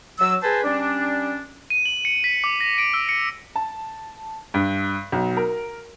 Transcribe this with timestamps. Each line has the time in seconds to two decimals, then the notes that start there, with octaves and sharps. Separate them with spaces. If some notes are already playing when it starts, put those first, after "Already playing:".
0.19 F#3 E6
0.43 G#4 B4 C5 G#5 A5
0.64 G3 C#4 D4
1.70 D#7
1.86 F#7
2.05 C#7
2.24 B6
2.44 D6
2.60 A#6
2.78 D7
2.94 E6
3.09 C#7
3.56 A5
4.54 G2
5.12 B1
5.37 A#4